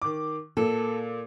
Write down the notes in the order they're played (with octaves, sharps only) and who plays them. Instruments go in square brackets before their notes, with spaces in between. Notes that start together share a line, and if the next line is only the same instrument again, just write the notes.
[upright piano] D#3 D6
[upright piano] A#2 [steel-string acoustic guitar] A4